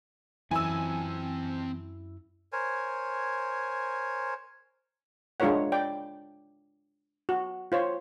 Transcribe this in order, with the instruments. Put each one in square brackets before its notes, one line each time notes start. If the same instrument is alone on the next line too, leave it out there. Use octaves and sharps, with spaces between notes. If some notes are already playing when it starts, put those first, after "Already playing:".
[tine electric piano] F#2 E4 [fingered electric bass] E3 [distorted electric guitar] C4 A5 [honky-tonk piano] G#5 E6
[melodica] A#4 C5 C#5 G#5
[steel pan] G#3 D4 F4 A#4 C#5 F#5
D5 G5
F#4
F4 C5 C#5